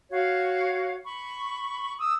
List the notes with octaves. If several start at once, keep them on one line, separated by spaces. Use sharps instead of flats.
F#4 C#5 F5
B5 C#6
D#6 E6